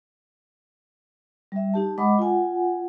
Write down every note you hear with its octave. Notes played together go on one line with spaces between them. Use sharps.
G3 E5
D#4 G4 A5
G#3 D#5 F#5 B5 D6 D#6
F4 F#5 G#5